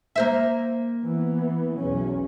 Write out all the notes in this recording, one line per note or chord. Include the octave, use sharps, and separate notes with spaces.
A#3 C5 E5
E3 B3
B1 E2 C#4